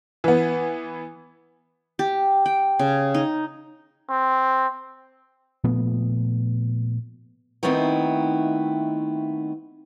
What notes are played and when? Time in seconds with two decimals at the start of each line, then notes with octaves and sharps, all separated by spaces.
0.24 E3 B3
1.99 G4
2.46 G5
2.79 C#3
3.14 D#4
4.09 C4
5.64 A#2 F3 A3 B3
7.63 D#3 A3 B3 C4 D#4 E4